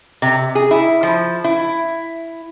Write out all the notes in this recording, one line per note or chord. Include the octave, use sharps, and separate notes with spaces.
C3
G#4
E4
F3
E4